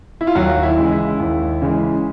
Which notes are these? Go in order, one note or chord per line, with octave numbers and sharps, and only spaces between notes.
E4
F4
D#2 F#3 F#4
E4
C#3 E3 G#3
E4
D#2
C#3 E3 G#3